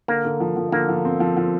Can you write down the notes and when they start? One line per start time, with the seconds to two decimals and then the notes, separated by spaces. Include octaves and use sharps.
0.08 D3 A#3
0.25 D3
0.40 F3
0.57 F3
0.72 D3 A#3
0.89 F3
1.05 C4
1.20 F3
1.37 F3